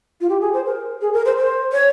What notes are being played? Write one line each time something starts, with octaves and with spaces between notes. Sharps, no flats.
F4
G4
G#4
C5
A#4
G#4
A#4
C5
C5
C#5